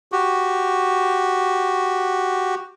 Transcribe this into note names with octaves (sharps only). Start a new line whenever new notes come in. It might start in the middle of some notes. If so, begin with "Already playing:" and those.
F#4 G4